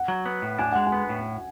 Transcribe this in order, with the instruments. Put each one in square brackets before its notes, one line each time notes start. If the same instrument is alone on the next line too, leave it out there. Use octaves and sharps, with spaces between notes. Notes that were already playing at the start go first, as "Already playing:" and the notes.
Already playing: [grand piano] F#5
[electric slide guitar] F#3
B3
A2
[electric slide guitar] D4 [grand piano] G#5
[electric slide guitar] G#3 [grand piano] F#5
[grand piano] G#5
[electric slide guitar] B3
A2